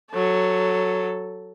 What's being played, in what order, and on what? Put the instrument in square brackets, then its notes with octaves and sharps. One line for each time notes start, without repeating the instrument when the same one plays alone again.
[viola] F#3 A4